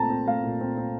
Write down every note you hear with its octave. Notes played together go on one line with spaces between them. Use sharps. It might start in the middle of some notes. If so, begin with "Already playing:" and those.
Already playing: A#2 A3 C4 A5 A#5
C4
A3 F5
A#2
C4
C4